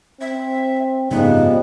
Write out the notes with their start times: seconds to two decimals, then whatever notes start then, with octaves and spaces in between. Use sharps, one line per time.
0.21 C4 E5
1.11 F#1 G#2 C#3 F3 G3 G#3 B3 D#4